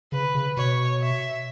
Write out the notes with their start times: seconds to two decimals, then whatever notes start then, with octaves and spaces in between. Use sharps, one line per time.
0.12 C#3 B4
0.35 C#3
0.57 B2 C#5
1.02 E5